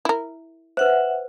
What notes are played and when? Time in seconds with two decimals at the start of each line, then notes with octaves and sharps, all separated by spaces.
0.05 E4 A#4
0.77 B4 C5 E5 F#5